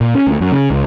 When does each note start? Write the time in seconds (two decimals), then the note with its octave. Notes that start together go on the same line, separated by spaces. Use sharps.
0.01 A#2
0.15 C#4
0.27 D2
0.40 F#2
0.52 C#3
0.71 C#2